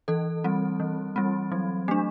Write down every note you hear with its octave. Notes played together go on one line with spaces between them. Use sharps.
E3 A4
G3 C4
E3
G3 C4
F#3
A3 D4